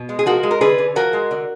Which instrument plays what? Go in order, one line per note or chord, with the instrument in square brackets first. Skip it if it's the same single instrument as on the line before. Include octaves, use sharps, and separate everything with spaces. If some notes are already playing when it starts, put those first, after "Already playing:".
Already playing: [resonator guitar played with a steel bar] B2
G#3
G#4
F3 F#4 A#4
G#3
A#4
D3 G#4 B4
D3
F3 F#4 A#4
G#3
D3